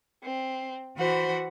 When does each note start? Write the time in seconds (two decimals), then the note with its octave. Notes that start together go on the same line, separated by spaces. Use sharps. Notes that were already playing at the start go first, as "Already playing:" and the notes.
0.24 C4
0.97 E3 F#4 C5 F#5 B5